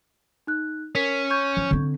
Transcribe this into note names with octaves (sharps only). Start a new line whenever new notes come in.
D#4 F#6
C#4 A#4 B6
C#6 G6 G#6
F3
D3 C4